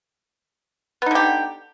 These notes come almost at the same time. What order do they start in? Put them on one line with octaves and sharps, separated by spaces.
B3 D#4 D3 G4